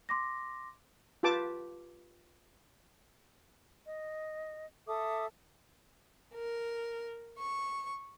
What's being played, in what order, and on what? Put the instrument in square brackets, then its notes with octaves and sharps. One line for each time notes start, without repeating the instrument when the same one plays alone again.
[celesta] C6 D6 A#6
[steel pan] F4 G4 B4 A5 D6
[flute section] D#5
A4 E5 D6 D#6
[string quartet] A#4
C#6